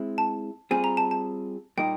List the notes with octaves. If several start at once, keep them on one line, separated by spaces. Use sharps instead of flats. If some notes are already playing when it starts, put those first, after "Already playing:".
Already playing: G#3 C4 E4
A5
G3 C4 F4 G#4 G#5
A#5
A5
A5
A#2 G3 A#3 D#4 G5